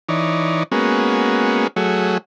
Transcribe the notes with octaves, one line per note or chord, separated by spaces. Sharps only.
E3 D#4 C#5 D5
G#3 A#3 B3 C#4 F#4
F#3 A3 F#4 G#4 C#5